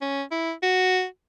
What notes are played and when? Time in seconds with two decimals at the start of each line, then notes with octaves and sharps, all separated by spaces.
0.01 C#4
0.31 E4
0.63 F#4